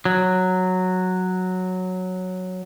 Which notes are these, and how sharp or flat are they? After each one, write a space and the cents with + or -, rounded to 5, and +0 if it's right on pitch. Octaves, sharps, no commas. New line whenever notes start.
F#3 -5